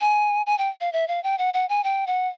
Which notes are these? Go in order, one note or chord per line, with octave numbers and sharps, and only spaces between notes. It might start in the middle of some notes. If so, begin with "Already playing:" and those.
G#5
G#5
G5
F5
E5
F5
G5
F#5
F#5
G#5
G5
F#5